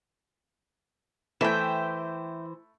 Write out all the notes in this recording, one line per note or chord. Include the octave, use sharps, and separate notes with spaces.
E3 A3 E4 C5 E5 G5